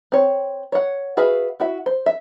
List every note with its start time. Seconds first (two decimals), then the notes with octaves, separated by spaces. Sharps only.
0.12 C4 C#5
0.72 C#5 F#5
1.17 F#4 G#4 B4 E5 F5
1.60 E4 F#4 E5
1.86 C5
2.06 E5